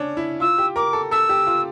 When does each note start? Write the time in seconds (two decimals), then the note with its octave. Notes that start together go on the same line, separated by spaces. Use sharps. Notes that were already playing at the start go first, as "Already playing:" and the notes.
Already playing: C#4 D4
0.17 E4
0.40 F4 E6
0.58 G4
0.76 A#4 D6
0.93 A4
1.11 A4 E6
1.29 G4
1.47 F4